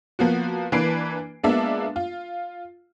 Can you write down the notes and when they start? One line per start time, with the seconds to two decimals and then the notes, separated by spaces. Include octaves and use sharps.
0.19 F3 A#3 B3 F#4
0.72 E3 A#3 D4 B4 C7 D7
1.43 G#3 A#3 B3 D4 F4 E5
1.96 F4